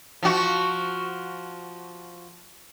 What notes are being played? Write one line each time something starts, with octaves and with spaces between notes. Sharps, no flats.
F3 F#4